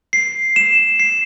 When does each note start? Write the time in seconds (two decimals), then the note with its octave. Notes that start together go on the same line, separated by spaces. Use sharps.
0.13 C7
0.56 E7
1.00 C7